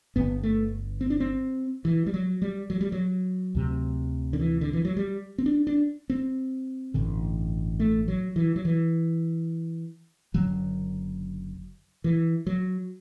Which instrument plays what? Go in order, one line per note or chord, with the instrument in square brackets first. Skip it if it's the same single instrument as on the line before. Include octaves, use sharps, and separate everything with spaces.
[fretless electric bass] G1 G2 D3 B3
A3
C4
D4
C4
E3
G3
F#3
G3
F#3
G3
F#3
D2 C3
D3
E3
D3
E3
F#3
G3
C4
D4
D4
C4
A1 G2 D3
A3
F#3
E3
F#3
E3
F#1 F#2 D3 F#3
E3
F#3